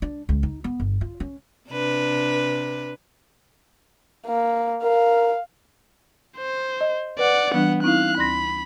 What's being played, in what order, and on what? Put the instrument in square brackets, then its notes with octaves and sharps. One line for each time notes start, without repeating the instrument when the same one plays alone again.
[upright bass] D4
C#2
D#4
B3
G1
F4
C#4
[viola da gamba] C3 D4 B4
[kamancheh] A#3
[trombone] A#4 [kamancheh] F5
[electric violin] C5
[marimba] D#5
[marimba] B4 [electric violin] D5 F#5
[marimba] E3 G3 D4 [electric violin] B3 F#5
[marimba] C4 D#4 E4 [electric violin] F5 F#6
[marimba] D2 C6 A#6 [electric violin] B5